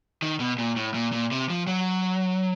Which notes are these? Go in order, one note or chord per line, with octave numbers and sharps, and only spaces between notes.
D#3
B2
A#2
A2
A#2
A#2
C3
F3
F#3